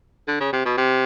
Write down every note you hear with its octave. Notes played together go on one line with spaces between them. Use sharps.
D3
C#3
C3
B2
C3